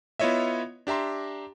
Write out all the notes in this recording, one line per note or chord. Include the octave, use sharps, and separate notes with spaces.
B3 E4 F4 C#5 D#5 E5
D4 G4 E5 A#5 C6